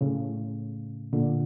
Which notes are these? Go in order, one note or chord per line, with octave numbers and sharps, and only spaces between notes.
A2 C#3
A#2 D3